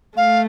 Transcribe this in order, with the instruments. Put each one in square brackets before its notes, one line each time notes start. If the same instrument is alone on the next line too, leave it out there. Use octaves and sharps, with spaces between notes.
[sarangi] A3 [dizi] F5